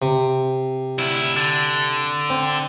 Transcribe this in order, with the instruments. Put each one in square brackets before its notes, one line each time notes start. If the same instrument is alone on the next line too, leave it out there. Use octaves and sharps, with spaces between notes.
[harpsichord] C3
[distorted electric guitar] D2 E4
D3
[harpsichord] C4